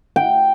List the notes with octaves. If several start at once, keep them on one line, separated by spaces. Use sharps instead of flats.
G5